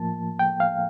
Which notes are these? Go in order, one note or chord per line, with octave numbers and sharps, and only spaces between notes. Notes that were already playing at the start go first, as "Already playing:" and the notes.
Already playing: A2 F3 A#3 A5
G5
F5